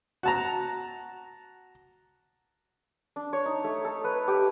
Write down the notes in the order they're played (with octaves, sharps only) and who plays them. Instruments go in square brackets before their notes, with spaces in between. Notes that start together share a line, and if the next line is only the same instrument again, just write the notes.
[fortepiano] F#4 A5 A#5
[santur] D4
C#5
D#4
A3
A4
B4
G4